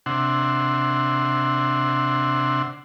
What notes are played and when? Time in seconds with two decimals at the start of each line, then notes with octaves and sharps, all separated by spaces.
0.06 C3 D4 E5 F#5 C6